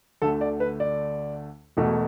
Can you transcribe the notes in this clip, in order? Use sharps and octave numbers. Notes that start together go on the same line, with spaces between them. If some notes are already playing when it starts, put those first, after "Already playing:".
D2 D3 A3 A4
D5
B4
D5
E1 E2 B2 A3